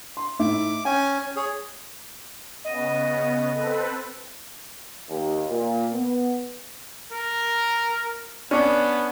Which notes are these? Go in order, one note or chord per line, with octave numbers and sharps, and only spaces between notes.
C6
A2 D#4 E5 D6
C#4 G5 G#5
G#4 C#5
C#3 B3 D#5
C4 A4 B4
D#2
A#2
B3
A#4
B3 C#4 D4